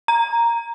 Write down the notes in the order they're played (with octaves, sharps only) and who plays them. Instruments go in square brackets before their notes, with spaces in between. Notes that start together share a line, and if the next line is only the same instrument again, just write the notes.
[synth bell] A#5